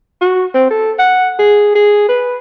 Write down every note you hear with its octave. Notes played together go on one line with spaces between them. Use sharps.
F#4
C4
A4
F#5
G#4
G#4
B4